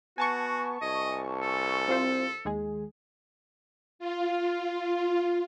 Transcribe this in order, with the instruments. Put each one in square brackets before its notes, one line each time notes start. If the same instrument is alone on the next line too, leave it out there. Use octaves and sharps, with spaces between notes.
[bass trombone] B3 [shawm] F#4 [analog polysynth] G#5 A5 C#6
[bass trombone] C2 [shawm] D#5
[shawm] A4
[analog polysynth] C4 F4 C5
D#2 G#3 G#4
[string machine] F4